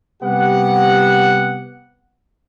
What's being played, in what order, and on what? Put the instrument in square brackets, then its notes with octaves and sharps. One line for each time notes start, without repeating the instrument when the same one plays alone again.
[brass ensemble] C3 G3 B3 G4 F#5